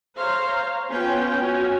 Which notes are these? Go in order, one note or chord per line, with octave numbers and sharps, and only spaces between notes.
C5 C#5 F5 A#5
B3 C#4 F4 G5
C#4 F#4